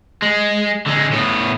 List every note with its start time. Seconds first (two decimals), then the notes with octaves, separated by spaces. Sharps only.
0.22 G#3
0.86 D3 G#3
1.11 A2 B3